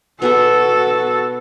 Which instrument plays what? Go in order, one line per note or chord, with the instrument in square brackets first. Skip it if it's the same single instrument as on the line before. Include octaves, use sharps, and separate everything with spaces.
[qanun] B2 B3 C#6 [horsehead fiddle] F#4 A4